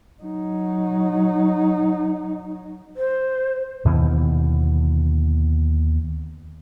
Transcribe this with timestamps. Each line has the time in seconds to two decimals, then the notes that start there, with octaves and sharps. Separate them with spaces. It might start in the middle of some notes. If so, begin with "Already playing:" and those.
0.23 F#3 D#4
2.96 C5
3.85 D#2 B2 D3 E3